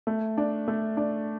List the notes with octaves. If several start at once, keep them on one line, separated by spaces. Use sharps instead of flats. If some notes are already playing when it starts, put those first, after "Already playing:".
A3
D4
A3
D4